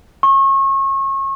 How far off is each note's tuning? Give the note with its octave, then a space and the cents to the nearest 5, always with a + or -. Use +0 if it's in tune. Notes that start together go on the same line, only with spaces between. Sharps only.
C#6 -35